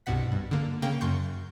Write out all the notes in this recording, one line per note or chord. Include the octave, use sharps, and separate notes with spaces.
C2 G2 B2 F#5 B6
G2
D3 A#3
C#3 A#3 G5
F#2 C6 C#6 G6